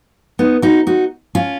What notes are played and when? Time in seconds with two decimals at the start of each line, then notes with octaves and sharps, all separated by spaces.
0.39 B3 D#4
0.62 D#4 F#4
0.87 D#4 F#4
1.35 C#4 F4